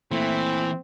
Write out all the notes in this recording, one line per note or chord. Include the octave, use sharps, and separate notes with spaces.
A#2 E3 A3 C4